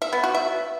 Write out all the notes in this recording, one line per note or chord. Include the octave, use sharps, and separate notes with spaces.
E5
B3
F#4
E5